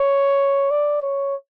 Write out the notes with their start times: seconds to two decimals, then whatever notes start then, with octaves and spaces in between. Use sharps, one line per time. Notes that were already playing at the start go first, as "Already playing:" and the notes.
Already playing: C#5
0.71 D5
1.02 C#5